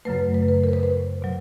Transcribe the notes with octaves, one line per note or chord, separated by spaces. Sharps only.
F#2 C#3 F#3 A3 B4
B4
B4
A#4
C5
B4
C5
B2 F#3